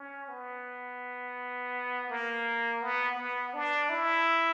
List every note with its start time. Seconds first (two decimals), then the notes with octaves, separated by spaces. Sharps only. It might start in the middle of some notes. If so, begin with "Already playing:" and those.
Already playing: C#4
0.29 B3
2.10 A#3
2.82 B3
3.17 B3
3.54 D4
3.89 E4